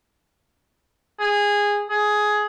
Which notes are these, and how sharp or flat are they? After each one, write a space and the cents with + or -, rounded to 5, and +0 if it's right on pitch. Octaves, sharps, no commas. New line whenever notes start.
G#4 -15
G#4 +15